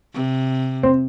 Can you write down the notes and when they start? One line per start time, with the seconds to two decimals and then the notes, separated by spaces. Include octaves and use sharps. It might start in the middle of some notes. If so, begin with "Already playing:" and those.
0.14 C3
0.83 C4